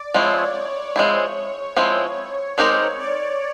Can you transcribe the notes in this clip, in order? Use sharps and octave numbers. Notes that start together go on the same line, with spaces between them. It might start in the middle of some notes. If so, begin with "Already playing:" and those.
Already playing: D5
F3 G#3 C4 E4 C#5
F3 G#3 C4 E4
F3 G#3 C4 E4
G#3 C4 D#4 G4 A#4 C#5
D5